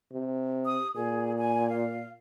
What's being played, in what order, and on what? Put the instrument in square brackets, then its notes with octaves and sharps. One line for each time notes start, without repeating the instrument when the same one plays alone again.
[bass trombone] C3
[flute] D#6
[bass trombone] A#2 [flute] G#4
[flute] G#5
F5